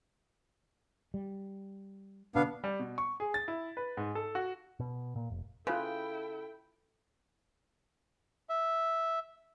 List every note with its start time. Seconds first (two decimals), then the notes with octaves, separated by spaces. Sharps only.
1.14 G3
2.35 B2 D3 B3 D4 F5
2.64 G3
2.80 B2
2.98 C#6
3.20 G#4
3.34 A6
3.48 E4
3.77 B4
3.97 G#2
4.15 A4
4.35 F#4
4.80 B2
5.16 A#2
5.30 F1
5.67 C#3 E4 F4 A4 B4 G5
8.49 E5